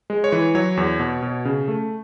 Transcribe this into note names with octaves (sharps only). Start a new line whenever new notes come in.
G#3
C#5
E3
F#3 C#5
E2
B2
B2
C#3
A3